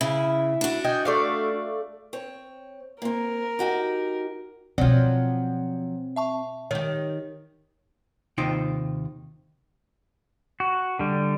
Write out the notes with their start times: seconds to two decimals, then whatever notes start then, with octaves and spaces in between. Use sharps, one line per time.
0.01 C#3 E4
0.61 D4 F#4
0.84 D#5 G5 G#5
1.05 A3 D5 F5
2.13 C4 C#5
3.02 A#3 C4 A#4
3.59 D#4 F#4 G4
4.78 B2 F3 F#3 C4 F4 D5
6.16 E5 A5 C#6
6.71 D#3 G4 C#5
8.38 D#2 C3 D#4 F4 C5 G5
10.60 F#4
10.99 D3 G3